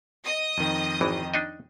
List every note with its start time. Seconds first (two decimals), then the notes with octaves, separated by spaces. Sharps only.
0.24 D#5 D#6
0.57 F2 D#3
1.01 G#1 E3
1.34 D4 D#4 D#5